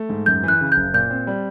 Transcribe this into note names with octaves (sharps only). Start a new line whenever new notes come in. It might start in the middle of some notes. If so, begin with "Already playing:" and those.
Already playing: A3
G#2
F#2 G6
E3 F#6
C#3
F#1 G6
A#2 G6
C4
G3